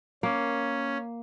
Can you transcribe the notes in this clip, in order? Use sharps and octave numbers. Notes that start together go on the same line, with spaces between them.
A#3 C#4